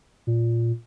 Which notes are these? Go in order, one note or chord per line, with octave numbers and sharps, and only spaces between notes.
A#2